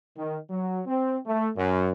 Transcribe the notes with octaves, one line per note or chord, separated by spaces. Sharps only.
D#3
F#3
C4
A3
F#2